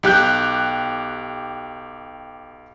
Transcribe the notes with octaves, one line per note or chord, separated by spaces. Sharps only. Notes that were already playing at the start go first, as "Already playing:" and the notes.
B1 G4 F#6 G6